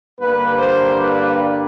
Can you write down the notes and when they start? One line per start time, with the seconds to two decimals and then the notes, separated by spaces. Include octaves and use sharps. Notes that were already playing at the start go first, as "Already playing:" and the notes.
0.20 G2 D3 G3 A#3 B4
0.59 C5
0.99 B4